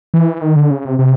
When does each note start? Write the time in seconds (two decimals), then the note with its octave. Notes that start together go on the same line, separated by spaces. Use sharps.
0.14 E3
0.42 D#3
0.56 D3
0.71 C#3
0.85 C3
0.99 C3